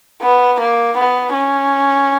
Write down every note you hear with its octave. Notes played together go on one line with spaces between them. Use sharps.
B3
A#3
B3
C#4